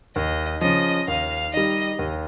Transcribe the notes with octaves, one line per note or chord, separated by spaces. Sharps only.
D#2 D#5
C#3 F3 D#5
D#2 F5
D#3 G3 D#5
D#2